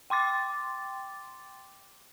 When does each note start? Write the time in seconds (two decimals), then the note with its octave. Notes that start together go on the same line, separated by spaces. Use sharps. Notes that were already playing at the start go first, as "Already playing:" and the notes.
0.10 G5 C6 D6 A6